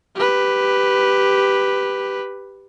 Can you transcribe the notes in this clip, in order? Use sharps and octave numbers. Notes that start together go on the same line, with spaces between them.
G4 B4